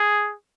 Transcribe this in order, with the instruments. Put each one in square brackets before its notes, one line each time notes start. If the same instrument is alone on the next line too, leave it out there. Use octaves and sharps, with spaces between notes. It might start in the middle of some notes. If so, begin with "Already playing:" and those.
Already playing: [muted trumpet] G#4